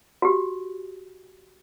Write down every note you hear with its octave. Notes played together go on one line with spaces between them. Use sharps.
F#4 G4